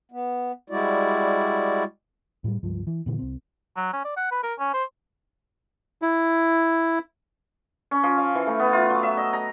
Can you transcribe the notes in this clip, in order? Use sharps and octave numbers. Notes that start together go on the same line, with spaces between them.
B3
G3 G#3 E4 F#4 D5
A2 F#3 G3
C#2 G2 F3
E3
A#2 D3 E3
C2 C4
F#3
C#4
D5
F#5
B4
A#4
C#4
C5
E4
C#4
F3
F5
E3
A3
B3
F4
F#3
E5
D#5
A#5